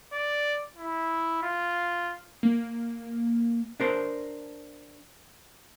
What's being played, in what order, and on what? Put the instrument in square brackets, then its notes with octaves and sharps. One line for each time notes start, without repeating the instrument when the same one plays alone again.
[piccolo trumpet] D5
E4
F4
[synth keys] A#3
[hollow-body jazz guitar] D4 A#4 C5